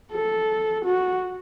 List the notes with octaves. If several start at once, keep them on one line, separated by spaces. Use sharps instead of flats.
A4
F#4